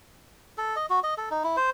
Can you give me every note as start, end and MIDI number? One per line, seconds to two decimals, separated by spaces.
0.58 0.76 69
0.76 0.86 75
0.90 1.00 66
1.04 1.14 75
1.18 1.29 69
1.31 1.43 63
1.44 1.56 64
1.57 1.70 72